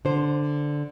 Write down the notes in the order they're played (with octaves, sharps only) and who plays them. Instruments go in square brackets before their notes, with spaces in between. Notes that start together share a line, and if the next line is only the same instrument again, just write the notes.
[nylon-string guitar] D3 C5